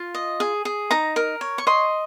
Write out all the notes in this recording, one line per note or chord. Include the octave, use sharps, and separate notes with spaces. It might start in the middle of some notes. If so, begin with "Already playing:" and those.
Already playing: F4
D#5
G#4
G#4
D#4 A#5
A#4
C#5
C#6
D#5 C6